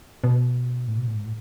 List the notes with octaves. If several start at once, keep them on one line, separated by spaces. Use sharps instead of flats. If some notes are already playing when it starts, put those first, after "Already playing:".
B2
A2
B2
A2
G#2
A2